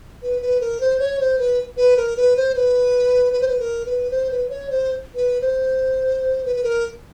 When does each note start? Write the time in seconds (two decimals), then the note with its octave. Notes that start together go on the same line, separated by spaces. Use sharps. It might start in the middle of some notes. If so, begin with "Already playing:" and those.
0.22 B4
0.41 B4
0.60 A#4
0.80 C5
0.99 C#5
1.19 C5
1.38 B4
1.77 B4
1.97 A#4
2.17 B4
2.36 C5
2.55 B4
3.33 B4
3.41 C5
3.48 B4
3.59 A#4
3.86 B4
4.10 C5
4.30 B4
4.49 C#5
4.70 C5
5.15 B4
5.41 C5
6.45 B4
6.56 B4
6.63 A#4